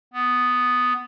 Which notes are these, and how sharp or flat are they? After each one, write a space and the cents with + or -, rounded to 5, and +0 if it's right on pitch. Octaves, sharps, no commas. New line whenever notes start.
B3 +10